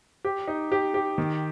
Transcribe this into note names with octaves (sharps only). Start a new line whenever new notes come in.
G4
D#4
G4
G4
D#3